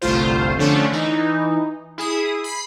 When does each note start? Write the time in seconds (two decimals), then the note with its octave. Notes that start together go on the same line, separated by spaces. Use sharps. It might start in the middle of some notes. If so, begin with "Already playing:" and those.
0.02 G1 C2 A3 F4 C5
0.58 D3 F3 A3 C#4 D4
0.92 E3 D#4
1.98 E4 G#4 D#6
2.44 B5 C7